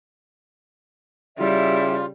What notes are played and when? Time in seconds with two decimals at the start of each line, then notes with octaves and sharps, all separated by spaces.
1.39 C#3 G3 E4 F4 G4 E5